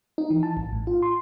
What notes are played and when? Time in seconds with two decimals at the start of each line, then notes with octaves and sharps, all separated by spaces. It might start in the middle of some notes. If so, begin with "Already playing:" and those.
0.18 D#4
0.30 E3
0.43 A5
0.57 A1
0.72 A2
0.87 F4
1.03 C6